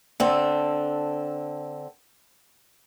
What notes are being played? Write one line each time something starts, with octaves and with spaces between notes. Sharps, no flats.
D3 C4 A4